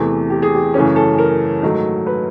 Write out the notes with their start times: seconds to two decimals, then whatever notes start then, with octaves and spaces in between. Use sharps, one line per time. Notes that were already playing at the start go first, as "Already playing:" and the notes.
Already playing: E2 C3 E3 A3
0.30 G4
0.42 G#4
0.55 G4
0.74 F#2 C#3 E3 A3 C#4 G#4
0.96 A4
1.18 A#4
1.62 G#2 D#3 F#3 A3
2.07 B4